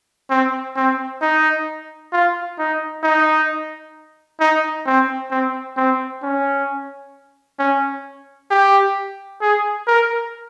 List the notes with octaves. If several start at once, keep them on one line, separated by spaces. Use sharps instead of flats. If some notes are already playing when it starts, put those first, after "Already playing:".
C4
C4
D#4
F4
D#4
D#4
D#4
C4
C4
C4
C#4
C#4
G4
G#4
A#4